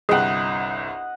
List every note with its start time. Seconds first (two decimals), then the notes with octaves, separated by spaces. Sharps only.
0.09 G1 C2 G#4 D#5 F#5 G5